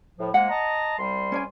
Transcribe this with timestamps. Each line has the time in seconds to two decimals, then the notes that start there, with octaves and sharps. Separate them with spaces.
0.19 A2 F3
0.34 F3 G#3 A#3 F#5
0.49 D#5 A5 A#5
0.98 C2 G3 C6
1.32 C#4 D5 G#5